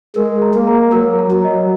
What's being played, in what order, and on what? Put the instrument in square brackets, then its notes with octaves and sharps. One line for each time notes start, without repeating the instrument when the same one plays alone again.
[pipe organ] G#3 [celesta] A#4
[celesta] A#5
[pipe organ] A#3
[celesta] A#5
[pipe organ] F#3 [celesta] A#4
[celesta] A#5
[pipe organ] F#3
[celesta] D#5